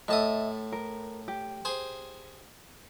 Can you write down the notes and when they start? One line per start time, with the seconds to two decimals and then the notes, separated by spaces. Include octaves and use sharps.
0.08 A2 D#5 E5 A5 D#6
0.72 A#4
1.28 G4
1.65 G#4 C5